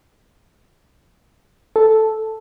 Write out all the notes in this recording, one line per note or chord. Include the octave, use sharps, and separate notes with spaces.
A4